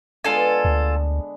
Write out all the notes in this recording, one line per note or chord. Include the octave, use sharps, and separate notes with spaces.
D3 G#3 B3 F4 A4 G#5
D2